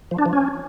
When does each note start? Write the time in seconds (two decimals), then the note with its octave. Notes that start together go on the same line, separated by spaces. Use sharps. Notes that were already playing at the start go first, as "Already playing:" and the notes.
0.11 F3
0.18 D4
0.26 F3
0.33 C#4